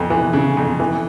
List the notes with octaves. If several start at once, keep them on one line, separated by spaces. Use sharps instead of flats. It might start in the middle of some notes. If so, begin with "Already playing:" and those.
Already playing: F2 E3
E3
C#3
F2
E3